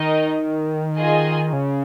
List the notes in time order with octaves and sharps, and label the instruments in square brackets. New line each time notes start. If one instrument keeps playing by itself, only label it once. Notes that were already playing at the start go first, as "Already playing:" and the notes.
Already playing: [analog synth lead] D#3 [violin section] D#4 A#4 D#5
[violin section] F4 G#4 D#5 G#5
[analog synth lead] C#3